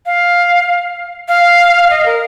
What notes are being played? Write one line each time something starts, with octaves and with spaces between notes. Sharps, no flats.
F5
F5
D#5
A#4